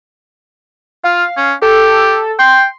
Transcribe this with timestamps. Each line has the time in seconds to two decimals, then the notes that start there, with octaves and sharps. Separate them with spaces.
1.04 F4 F5
1.37 C#4
1.62 G4 A4
2.39 G5 C6